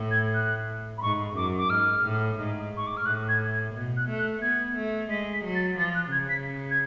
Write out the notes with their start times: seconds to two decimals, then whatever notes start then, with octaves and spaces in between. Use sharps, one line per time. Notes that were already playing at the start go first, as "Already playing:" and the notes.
Already playing: A2
0.11 G#6
0.34 F#6
0.98 B5
1.02 G#2 C#6
1.36 F#2 D6
1.58 D6
1.70 G#2 F6
2.05 A2
2.39 G#2
2.77 C#6
2.87 D6
2.97 F6
3.05 A2 F#6
3.29 G#6
3.51 G#6
3.74 B2
3.97 F#6
4.08 A3
4.19 F#6
4.42 B3 G#6
4.75 A3
5.10 G#3 B6
5.33 B6
5.44 F#3
5.55 A6
5.77 F3 A6
5.95 F#6
6.11 C#3 G#6
6.29 B6
6.71 G#6